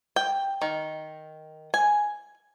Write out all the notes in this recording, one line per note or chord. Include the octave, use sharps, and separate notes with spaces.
G5
D#3
G#5